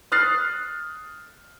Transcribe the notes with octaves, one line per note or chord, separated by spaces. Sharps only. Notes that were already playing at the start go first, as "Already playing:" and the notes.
D#6 F6 F#6 A6 C7